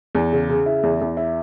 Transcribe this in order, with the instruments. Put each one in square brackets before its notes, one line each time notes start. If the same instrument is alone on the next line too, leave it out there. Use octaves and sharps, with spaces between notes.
[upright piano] E2
C#3
C#3
E4
E2
E2
E4